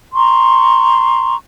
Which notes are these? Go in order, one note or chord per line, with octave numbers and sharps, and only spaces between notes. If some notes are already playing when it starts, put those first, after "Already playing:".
A#5 C6 C#6